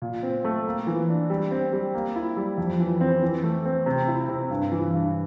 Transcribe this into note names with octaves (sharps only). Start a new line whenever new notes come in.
A#2
C4
A3
A#3
E3
D4
G3
C4
G3
A#3
E4
G3
F2
E3
C4
E3
A3
C4
C3
E4
C3
G2
E3
G2